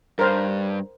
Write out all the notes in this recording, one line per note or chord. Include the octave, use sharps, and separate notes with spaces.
G2 A#4 C5